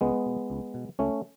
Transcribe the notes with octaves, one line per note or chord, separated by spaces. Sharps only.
C#2 G#3 B3
B2
C#2
B2
C#2 A3 C#4